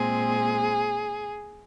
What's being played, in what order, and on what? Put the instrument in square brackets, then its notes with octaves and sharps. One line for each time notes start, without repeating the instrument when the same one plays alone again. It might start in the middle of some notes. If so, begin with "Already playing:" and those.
Already playing: [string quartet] A#2 G#3 C4 G#4